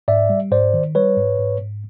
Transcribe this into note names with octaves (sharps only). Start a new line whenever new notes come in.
G#2 D5 E5
G3
G#2 C5 D5
D#3
G3 B4 C#5
G#2
G#2
G#2